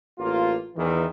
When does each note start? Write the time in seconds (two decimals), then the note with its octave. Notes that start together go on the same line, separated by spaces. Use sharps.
0.19 A1 A#3 F4
0.76 E2 D#3 E3